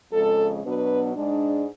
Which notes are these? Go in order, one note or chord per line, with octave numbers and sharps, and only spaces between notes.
F2 C#3 G#3 A4
B2 F#3 B3 D4 B4
G#2 G#3 D4